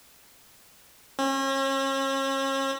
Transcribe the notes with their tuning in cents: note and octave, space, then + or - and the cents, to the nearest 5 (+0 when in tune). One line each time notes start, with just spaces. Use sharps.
C#4 -40